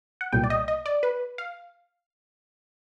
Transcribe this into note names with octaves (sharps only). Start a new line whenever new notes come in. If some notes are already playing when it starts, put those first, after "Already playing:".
F#5
C2 A#2 G3 B3 G5
D5
D#5
D#5
D5
B4
F5